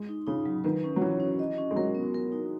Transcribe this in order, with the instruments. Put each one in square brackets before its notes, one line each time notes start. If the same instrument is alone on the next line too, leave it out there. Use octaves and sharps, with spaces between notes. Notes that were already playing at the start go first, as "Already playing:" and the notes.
Already playing: [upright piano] G#3
[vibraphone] D#4
[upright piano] C#3 [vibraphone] D#4
[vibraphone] F#3
[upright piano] D#3 [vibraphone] B4
[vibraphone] C#4
[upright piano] F#3
[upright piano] E3 [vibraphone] C#5
[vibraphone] C#4
D#5
C#4
[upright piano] G#3
[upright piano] F#3 [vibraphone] A#4
[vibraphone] B3
A#4
D#4